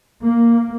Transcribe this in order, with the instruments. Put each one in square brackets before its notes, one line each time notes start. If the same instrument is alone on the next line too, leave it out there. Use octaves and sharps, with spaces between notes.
[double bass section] A#3